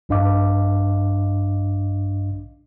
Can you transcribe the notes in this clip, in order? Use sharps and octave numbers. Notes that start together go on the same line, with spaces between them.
A#1 G2 D4 D#5 F5 D6